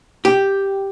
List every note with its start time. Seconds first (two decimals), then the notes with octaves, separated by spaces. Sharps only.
0.25 G4